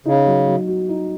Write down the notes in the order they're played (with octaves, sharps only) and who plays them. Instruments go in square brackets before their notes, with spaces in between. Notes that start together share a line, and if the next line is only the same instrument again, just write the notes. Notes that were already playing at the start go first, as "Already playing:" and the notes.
[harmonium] C#3 [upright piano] D#4
[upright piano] F#3
F#3
F#4
D#4